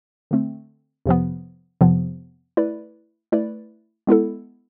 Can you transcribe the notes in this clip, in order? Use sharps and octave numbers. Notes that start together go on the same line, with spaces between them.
D3 A3 C4
F2 C3 F3 B3
F2 C3 F3 B3
A3 E4 B4 D5
A3 E4 B4 D5
G#3 B3 E4 A4